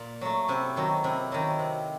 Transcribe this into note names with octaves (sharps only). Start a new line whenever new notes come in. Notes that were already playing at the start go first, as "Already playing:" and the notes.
Already playing: A#2
F#3 A3
C3 E4
D#3 F#3
C3 E4
D#3 F#3
C3